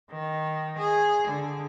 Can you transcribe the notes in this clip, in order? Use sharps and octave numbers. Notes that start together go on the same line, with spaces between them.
D#3
G#4
D3